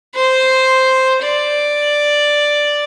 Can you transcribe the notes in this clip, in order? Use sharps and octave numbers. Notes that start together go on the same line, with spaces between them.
C5
D5